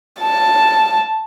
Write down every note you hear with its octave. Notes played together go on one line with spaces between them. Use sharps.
A5